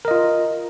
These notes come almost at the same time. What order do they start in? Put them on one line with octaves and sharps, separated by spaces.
A#4 D#5 F4